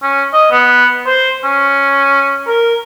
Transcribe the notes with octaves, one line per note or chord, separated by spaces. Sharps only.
C#4
D#5
B3
C5
C#4
A#4